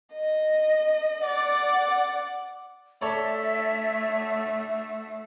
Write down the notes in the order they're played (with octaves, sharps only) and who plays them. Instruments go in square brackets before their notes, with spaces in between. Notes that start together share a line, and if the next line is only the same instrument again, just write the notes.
[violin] D#5
D5 F#5
[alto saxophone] A3 [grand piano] A4 C#5 D5 [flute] E5